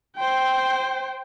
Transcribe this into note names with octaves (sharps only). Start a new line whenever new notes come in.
C5 G5